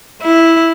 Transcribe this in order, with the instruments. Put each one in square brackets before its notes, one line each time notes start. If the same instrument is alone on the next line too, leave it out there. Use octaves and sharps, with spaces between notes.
[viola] E4